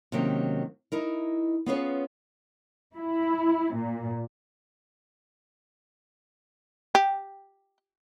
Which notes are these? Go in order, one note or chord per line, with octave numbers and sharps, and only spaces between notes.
C3 D#3 F#3 A#3 C#4 G4
D#4 E4 A#4
B3 C#4 F4 G#4 B4 C#5
E4
A#2
G4